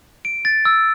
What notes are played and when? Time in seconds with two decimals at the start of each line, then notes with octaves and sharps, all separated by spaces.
0.25 D7
0.45 A6
0.65 E6